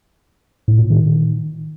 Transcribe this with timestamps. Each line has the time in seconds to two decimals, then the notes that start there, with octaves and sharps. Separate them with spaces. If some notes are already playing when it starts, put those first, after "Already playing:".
0.68 A2
0.79 A#2
0.90 D#3